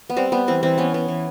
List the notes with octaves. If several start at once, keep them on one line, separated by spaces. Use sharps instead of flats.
B3
G3 C4
G3 B3
E3 C4
E3 C4
B3 C#4
B3
E3